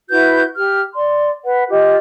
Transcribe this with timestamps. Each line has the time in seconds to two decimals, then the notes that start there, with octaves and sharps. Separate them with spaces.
0.09 E4 F#4 B4 G6
0.56 G4 F6
0.94 D5 C6
1.45 B4 F#5
1.70 F4 G4 D#5